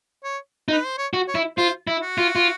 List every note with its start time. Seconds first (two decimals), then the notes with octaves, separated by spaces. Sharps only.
0.24 C#5
0.68 D#4
0.72 B4
0.85 C5
0.98 C#5
1.14 F#4
1.28 C#5
1.35 E4
1.58 F4 C5
1.87 E4
2.02 F#4
2.18 F4
2.36 F4